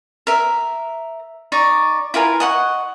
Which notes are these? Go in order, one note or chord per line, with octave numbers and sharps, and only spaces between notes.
A#4 E5
D#4 D5 C#6
E4 F4 A#4 G#5
D#5 F#5 C#6